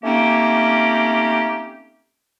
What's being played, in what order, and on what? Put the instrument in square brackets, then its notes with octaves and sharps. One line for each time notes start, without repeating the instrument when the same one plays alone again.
[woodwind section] A3 A#3 C4 C#4 D#4 G4